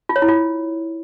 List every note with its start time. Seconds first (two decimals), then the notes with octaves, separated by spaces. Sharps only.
0.09 F4
0.16 C#5
0.22 E4
0.28 F4